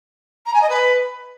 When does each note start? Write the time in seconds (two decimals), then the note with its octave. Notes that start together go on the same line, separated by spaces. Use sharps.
0.46 A#5
0.54 G#5
0.62 D#5
0.70 B4